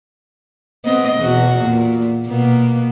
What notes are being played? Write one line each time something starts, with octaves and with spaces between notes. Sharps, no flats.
B3 C4 D#5
E2 B2 F#4
A#2
B2 A#3 B3